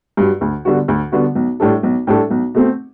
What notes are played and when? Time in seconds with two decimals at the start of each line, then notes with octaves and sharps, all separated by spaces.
0.17 G2 F#3
0.41 D2
0.65 D3 G3 B3 F#4
0.88 D2
1.12 D3 G3 B3 F#4
1.35 B1
1.60 A2 G3 D4 A4
1.83 B1
2.07 A2 G3 D4 A4
2.30 B1
2.54 B2 A3 C4